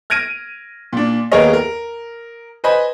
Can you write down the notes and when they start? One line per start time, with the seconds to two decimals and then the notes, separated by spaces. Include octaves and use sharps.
0.10 F6 G#6 A#6 D7 D#7
0.93 A#2 D4
1.32 D#2 B3 G#4 A#4 C#5 D#5
1.53 A#4
2.64 B4 C5 D#5 G#5 B5